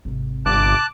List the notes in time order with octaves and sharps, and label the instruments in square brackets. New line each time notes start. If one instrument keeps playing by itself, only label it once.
[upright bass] G#1 C3
[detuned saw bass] G1 [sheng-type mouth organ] A5 F#6 [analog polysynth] D6